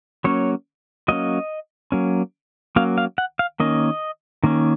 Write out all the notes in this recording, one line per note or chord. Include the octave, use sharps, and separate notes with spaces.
F#3 A#3 C#4 C#5
F#3 A#3 C#4 D#5
F#3 A#3 C#4
F#3 A#3 C#4 F5
F5
F#5
F5
D#3 A#3 C#4 D#5
D#3 A#3 C#4